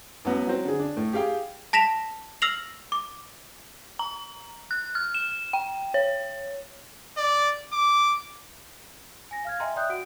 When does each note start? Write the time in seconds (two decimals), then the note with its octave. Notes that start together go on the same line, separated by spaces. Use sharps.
0.25 A1 F#3 B3
0.47 F#3 C4
0.65 D3 G#4
0.79 D4
0.97 A2
1.13 G4 G#4 F5 G5 D6
1.73 A5 A#6 B6 E7 F7
2.42 E6 F6 A#6 C7 F7 F#7
2.92 D6
3.99 A#5
4.71 F#6
4.95 F6
5.14 E7
5.53 G5
5.94 C#5
7.17 D5
7.73 D6
9.31 G#5 A#6
9.45 F5 F6 G#6
9.60 D#5 E5 G5 G#5 A#5 C6
9.76 D5 E5 G5 D#6 F#6 G6
9.89 F#4 F#5 D7